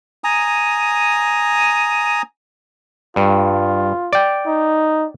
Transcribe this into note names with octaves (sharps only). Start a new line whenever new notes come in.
G#5 A#5 D#6
G2 F4
D5 G5
D#4